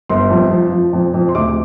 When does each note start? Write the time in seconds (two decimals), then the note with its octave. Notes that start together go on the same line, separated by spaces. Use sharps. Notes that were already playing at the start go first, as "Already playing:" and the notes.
0.10 G1 C6
0.30 F2
0.51 F3
0.72 F3
0.93 F2
1.14 F2
1.29 C6
1.35 D2 D6